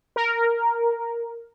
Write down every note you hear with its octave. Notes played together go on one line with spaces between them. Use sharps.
A#4